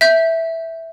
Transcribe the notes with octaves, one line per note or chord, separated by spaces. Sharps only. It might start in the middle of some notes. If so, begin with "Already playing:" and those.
E5 G6